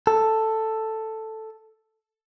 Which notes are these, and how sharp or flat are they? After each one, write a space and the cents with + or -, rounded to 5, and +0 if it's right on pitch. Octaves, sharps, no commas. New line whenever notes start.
A4 +5